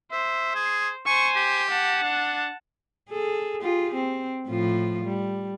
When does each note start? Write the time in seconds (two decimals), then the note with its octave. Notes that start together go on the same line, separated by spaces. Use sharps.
0.12 C5 E5
0.55 G#4
1.06 C5 G#5 C#6
1.36 G4
1.70 F#5 A5
2.03 D4
3.09 G#4 A4
3.62 F4 G4 G#4
3.94 C4
4.48 A2 F3 F4
5.04 G3